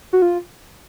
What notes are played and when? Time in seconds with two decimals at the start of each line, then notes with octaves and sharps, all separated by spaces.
0.13 F#4
0.22 F4